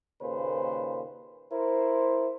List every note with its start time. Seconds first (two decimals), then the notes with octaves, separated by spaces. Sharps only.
0.22 D#2 A#2 C#3 B4 C5
1.53 E4 A#4 C5